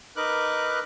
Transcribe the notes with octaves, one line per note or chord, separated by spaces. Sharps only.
D#4 A#4 B4 D6 F#6